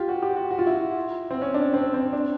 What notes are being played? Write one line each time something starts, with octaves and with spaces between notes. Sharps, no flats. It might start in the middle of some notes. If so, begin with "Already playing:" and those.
Already playing: F4 G4
F#4
G4
F#4
F#4
F4
E4
C4
C#4
D4
C4
C4
D4